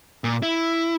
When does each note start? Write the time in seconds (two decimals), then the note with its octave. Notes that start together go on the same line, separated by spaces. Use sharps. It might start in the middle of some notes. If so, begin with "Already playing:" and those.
0.24 A#2
0.43 E4